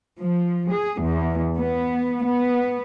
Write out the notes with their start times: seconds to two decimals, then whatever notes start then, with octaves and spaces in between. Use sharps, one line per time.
0.21 F3
0.71 G#4
1.03 E2
1.57 B3
2.25 B3